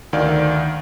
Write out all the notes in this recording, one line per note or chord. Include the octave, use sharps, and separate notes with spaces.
D2 D#3 D5 F5